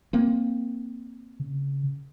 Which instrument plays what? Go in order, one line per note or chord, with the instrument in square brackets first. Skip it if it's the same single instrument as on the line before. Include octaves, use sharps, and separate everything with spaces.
[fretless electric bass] A#3 C4
[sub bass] C#3